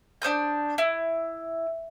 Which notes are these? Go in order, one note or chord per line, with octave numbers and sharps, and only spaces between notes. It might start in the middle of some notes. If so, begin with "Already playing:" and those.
D4 C5 D#6 G6
E4